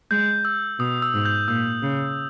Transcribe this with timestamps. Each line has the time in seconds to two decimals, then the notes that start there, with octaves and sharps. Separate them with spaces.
0.11 G#3 G6
0.45 E6
0.80 B2 D#6
1.02 E6
1.14 G#2
1.25 G6
1.48 A#2 E6
1.82 C#3